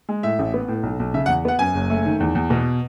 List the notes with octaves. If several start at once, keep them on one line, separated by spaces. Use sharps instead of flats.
G#3
A2 E5
A1
B3
A2
B1
B1
C#3 E5
F#5
E2
B3 F#5
F#2 G#5
F#1
A3
D#3
E2
E2
B2